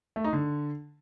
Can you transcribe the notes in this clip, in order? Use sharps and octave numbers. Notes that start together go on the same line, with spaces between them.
A3
D#4
D3